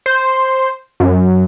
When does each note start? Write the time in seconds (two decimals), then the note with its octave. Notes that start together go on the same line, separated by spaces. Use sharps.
0.06 C5
1.00 F#2